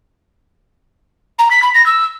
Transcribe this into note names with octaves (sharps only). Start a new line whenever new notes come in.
A#5
B6
B5
A#6
E6